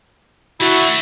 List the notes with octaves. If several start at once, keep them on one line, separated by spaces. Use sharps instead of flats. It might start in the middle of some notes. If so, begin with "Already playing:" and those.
A3 D4 E4 F#4